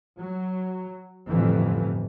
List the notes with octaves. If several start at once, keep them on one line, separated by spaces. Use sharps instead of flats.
F#3
G1 F2 A2 E3